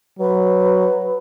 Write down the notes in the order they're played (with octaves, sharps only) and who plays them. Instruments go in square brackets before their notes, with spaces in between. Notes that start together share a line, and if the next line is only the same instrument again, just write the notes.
[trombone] F#3 [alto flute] B4